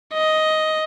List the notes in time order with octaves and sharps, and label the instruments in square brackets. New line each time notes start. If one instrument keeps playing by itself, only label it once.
[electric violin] D#5